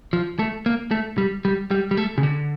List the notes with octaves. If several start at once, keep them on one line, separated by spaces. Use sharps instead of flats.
F3
A3
A#3
A3
G3
G3
G3
G3
A3
C#3
D3